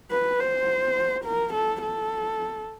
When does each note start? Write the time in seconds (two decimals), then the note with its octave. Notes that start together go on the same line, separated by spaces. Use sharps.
0.11 B4
0.40 C5
1.25 A#4
1.54 A4
1.82 A4